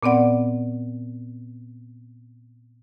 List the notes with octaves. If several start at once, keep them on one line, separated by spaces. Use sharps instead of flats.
A#2 B3 C4 D5 F#5